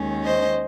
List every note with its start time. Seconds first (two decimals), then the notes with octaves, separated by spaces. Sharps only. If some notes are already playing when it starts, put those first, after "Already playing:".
Already playing: D#2 D#3 G#3 C#4
0.25 C5 D#5